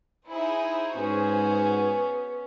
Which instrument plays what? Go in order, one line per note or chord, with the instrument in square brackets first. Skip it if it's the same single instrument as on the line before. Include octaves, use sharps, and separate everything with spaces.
[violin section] D#4 E4 G#4 [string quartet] C5
[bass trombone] G#2 [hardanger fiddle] B3 C#4 [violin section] F#4 G#4